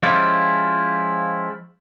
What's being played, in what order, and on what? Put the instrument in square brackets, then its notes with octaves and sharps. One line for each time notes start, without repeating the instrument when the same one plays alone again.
[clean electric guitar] F3 G#3 C#4 E4 F4 G4